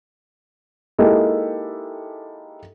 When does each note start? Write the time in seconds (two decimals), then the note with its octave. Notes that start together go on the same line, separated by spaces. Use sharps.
0.98 G#3 A#3 D#4 E4 G4 A4